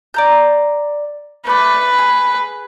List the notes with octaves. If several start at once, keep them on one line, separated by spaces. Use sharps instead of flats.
D5 A#5 G6
A3 B4 D5
G#4